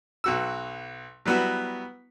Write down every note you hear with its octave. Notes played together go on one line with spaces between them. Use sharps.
B1 F#4 E6
F#3 G3 B3 E4 F#4